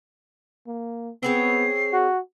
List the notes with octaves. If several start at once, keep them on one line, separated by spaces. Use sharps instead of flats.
A#3
B3 C4 G#4 C#5 C7
F#4